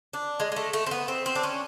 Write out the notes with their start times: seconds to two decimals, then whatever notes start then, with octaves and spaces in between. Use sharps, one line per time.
0.13 D4
0.40 G#3
0.52 G#3
0.56 A3
0.73 A3
0.86 C4
0.91 B3
1.08 C4
1.26 C4
1.35 D4
1.43 C#4